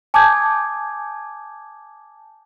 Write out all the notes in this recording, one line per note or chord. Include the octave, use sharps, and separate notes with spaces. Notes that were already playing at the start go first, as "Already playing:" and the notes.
G#5 A5 D6 D#6 G6 G#6